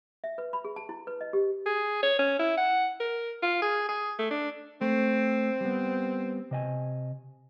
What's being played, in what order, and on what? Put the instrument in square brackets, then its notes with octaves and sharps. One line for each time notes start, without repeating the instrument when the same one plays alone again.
[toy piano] E5
B4
B5
G#4
A5
E4
B4
D#5
G4
[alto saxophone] G#4
C#5
C#4
E4
F#5
A#4
F4
G#4
G#4
A3
D4
[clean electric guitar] A3 [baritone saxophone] C4
[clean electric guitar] G3 B3
C3 D#5 G#5